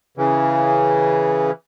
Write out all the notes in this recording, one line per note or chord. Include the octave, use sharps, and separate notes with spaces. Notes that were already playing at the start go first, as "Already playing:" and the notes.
C#3 E3